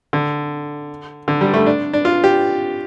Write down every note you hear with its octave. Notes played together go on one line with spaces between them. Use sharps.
D3
D3
G3
A3
D4
D4
F4
G4